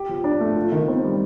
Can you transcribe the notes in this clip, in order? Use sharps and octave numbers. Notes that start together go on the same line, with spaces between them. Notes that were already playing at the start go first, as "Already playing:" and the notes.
Already playing: G4
F3
D4
A3
F4
D#3
C4
G3